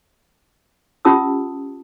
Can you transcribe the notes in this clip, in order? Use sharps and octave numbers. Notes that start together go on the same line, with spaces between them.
C#4 F4 G4 A5 D#6 E6